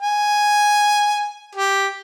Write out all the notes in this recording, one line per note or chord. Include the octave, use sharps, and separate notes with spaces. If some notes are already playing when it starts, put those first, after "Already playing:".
G#5
G4